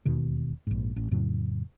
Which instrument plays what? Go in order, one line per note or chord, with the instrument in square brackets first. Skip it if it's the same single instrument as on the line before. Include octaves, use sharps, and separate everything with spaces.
[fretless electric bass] E1 D#2 B2 D#3
A#1 G#2
A1
F2 A2 C#3 F#3